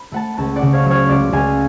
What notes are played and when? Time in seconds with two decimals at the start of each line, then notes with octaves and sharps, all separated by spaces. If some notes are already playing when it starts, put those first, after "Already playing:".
Already playing: B5
0.12 A3 F#5 A5
0.37 C#2 F#5 A5
0.56 D5 F#5
0.62 C#3
0.73 C#5 F5
0.85 F#3
0.90 C#5 F5
1.09 C#2 D5 F#5
1.32 C#2 F5 G#5